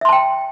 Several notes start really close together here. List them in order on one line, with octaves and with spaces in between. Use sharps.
E5 C6 A5 G5